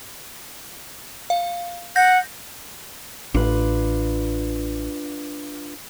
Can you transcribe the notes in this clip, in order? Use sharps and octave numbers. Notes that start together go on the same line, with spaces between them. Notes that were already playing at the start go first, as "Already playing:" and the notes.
F5
F#5 G6 A#6
A1 D4 F4 B4